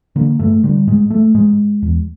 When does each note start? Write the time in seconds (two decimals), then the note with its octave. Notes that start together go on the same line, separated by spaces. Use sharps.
0.16 D3 A#3
0.39 G2 A3
0.64 D3 G3
0.87 G#2 G#3
1.10 A3
1.34 G#2 G#3
1.82 E2